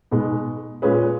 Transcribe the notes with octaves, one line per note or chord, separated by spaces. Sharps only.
B2 G#3 B3 D#4
A#2 G#3 C#4 G#4 B4